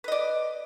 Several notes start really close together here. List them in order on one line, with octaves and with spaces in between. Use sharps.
B4 D#5 D5